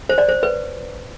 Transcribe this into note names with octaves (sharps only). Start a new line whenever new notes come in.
C5
D5
C5
B4